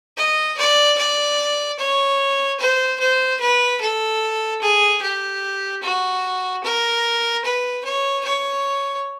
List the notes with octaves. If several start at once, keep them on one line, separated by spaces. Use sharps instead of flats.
D#5
D5
D5
C#5
C5
C5
B4
A4
G#4
G4
F#4
A#4
B4
C#5
C#5